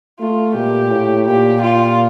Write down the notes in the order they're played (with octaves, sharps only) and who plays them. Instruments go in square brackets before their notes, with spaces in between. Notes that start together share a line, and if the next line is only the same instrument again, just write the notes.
[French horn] A3 [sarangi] F4
[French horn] A#2 [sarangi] G4
[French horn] A2
[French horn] A#2 [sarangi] G4
[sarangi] F4